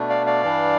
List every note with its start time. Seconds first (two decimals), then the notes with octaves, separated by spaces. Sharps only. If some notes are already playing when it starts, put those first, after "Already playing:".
Already playing: B2 A3 D4
0.09 D5 F5
0.26 D5 F5
0.43 G2 E3 G3 D4